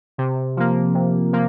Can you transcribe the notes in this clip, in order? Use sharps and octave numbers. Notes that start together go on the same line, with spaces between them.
C3
F3 A#3
C3
F3 A#3